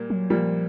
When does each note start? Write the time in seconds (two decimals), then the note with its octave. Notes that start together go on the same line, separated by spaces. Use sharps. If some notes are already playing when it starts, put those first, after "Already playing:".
Already playing: A#2 G3 A#3
0.10 F#3
0.30 A#2 F3 G3 A#3